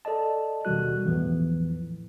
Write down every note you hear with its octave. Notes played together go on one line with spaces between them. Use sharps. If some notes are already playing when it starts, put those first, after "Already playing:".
A4 D5 D#5 A5
D#2 B2 D#3 G3 F#4 F#6
B1 E2 A2 E3 F3